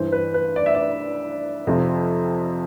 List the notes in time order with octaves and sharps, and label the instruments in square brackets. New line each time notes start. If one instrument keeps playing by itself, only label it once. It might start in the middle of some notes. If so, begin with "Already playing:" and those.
Already playing: [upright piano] G2 E3 C5
B4
B4
D5
E5
D5
F2 C3 F3